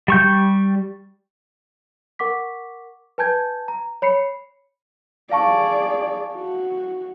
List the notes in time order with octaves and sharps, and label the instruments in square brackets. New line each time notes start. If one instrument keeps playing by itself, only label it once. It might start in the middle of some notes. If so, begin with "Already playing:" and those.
[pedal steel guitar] G3 C#6 G6
[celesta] A#4 F#5 C#6 D6 B6
B4 G#5 A5 G6 G#6
A#5
C#5 B5 C7 C#7
[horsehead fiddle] G#4 D5 [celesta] F5 A5 C#6
[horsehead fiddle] F#4